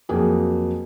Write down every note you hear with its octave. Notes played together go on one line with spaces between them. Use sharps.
F2 F#3 A#3 G#4